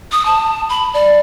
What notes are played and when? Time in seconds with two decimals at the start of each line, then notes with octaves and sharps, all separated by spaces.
0.12 D#6
0.26 A5
0.69 B5
0.94 D5